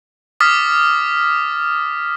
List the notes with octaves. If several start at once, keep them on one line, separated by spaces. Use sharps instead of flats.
D6 D#6 F6 A6 B6